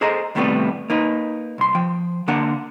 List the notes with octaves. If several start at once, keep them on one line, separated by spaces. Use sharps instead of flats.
G#4 A4 C5 D#5 A#5
D#2 A2 C3 G3 A3 B3
A#3 D#4 B4
C2 C6
F3 G5
D3 A#3 D4 A#4 F#5